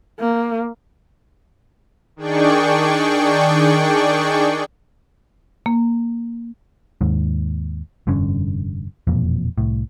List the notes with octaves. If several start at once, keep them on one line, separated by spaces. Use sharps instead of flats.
A#3
D#3 D4 G#4 D5 G5 C#6
A#3
D#2 G#2
F1 G2 D3 C#4
E1 F2 A#2
C2 A2